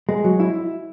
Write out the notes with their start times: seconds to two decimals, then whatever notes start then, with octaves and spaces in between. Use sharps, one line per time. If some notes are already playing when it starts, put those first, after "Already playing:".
0.09 G#3
0.24 F#3
0.40 E4